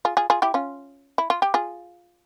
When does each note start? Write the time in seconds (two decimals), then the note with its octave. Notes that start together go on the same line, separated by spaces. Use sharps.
0.05 F4 G#4
0.17 F4 G#4
0.30 F4 G#4
0.42 E4 G4
0.54 C#4 F4
1.18 E4
1.30 F4
1.42 G4
1.54 F4 G#4